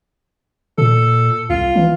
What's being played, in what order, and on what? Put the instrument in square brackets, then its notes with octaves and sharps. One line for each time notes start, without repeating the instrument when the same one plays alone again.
[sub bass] A#2 [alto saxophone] A4
[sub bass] C2 [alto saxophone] F4
[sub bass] E3